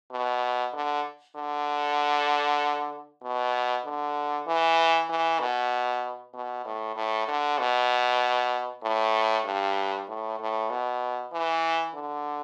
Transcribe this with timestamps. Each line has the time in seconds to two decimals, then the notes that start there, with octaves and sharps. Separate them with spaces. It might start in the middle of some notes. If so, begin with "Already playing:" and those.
0.11 B2
0.73 D3
1.36 D3
3.23 B2
3.85 D3
4.47 E3
5.09 E3
5.40 B2
6.34 B2
6.65 A2
6.96 A2
7.28 D3
7.59 B2
8.83 A2
9.45 G2
10.08 A2
10.39 A2
10.70 B2
11.32 E3
11.95 D3